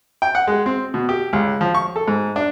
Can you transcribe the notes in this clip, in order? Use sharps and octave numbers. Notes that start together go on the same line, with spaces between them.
G5
F#5
G#3
C4
B2
G4
C#2
F3
C#6
A4
G#2
D4